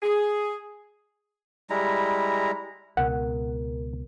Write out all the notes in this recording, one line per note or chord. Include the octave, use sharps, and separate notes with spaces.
G#4
G3 G#3 E4 A#5
C#2 B2 A#4 F#5